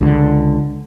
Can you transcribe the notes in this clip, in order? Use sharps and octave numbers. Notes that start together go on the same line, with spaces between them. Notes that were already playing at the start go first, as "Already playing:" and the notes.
C#2 D3